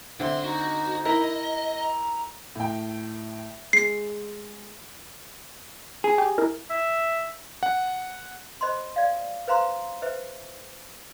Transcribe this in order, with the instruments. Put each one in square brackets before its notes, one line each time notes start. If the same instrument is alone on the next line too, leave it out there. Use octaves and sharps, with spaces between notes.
[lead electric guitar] B1 C6 [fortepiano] D3 C4 [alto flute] E5
[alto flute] D#4 [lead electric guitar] F#4
[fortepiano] E4 A#4 [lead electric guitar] D#5
[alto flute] A#5
[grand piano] A2 G5
[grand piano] G#3 [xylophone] C7
[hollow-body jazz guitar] G#4
[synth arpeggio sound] G4
E4 A#4
[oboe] E5
[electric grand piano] F#5
[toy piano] C5 D#5 B5 C6
D5 F5
B4 C5 F5 A#5 C6
B4 C5 E5